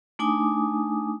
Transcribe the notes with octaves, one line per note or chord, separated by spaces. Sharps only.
A3 D4 D#4 G#5 D6 D#6